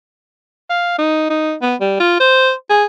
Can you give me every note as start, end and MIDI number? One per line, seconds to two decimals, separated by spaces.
0.70 0.98 77
0.98 1.27 63
1.30 1.54 63
1.62 1.75 59
1.80 1.96 55
2.00 2.20 65
2.20 2.52 72
2.70 2.85 68